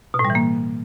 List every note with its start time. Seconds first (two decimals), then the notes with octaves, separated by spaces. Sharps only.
0.14 B2
0.19 A2
0.25 G3
0.30 E3
0.35 A#3